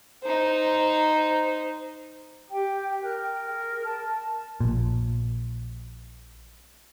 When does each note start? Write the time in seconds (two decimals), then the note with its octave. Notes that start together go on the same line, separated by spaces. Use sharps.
0.23 D#4 C5
2.50 G4 G5
3.03 A#4 F#6
3.16 G5
3.48 G#4
3.84 A5
4.60 A#1 A#2